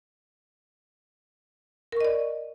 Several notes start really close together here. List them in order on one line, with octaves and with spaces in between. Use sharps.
A#4 C#6 D#5 D5